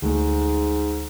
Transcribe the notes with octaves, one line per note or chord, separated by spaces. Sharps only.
D2 G#2 A3